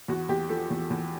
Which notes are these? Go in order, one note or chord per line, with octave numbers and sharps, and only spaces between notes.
E2 F#4
E2 G4
F3 A4
E2
E2